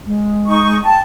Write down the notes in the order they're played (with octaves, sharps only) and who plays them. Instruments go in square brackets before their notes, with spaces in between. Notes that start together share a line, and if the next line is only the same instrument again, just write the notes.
[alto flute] G#3
[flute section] D#4 C#6
[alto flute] G5 [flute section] A5